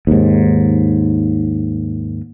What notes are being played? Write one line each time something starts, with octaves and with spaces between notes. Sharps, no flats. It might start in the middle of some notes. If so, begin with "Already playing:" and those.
D#2 G#2